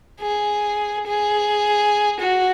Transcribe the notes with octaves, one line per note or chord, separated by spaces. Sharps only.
G#4
G#4
F#4